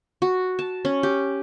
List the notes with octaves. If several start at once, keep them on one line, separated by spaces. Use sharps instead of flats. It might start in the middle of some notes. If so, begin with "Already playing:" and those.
F#4
A5
C#4
G4